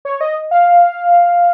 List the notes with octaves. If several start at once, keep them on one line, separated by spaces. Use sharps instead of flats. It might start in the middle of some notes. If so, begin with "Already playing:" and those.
C#5
D#5
F5